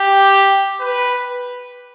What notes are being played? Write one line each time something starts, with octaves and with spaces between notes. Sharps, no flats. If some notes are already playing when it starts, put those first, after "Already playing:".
Already playing: G4
B4